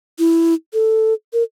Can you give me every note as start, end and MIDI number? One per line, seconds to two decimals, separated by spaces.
0.19 0.54 64
0.74 1.14 69
1.33 1.43 70